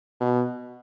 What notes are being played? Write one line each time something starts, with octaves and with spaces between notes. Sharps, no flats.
B2